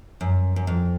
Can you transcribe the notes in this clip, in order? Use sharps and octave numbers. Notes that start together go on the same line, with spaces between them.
F#2
F#2
F2